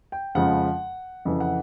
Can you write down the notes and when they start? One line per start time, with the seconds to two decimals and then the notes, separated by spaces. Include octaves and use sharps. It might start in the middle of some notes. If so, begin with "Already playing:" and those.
0.12 G5
0.35 F2 C#3 F3 G#3 F#5
1.25 F2 C#3 E3
1.40 F#5